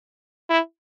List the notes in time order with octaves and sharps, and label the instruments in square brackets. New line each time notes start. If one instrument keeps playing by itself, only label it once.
[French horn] E4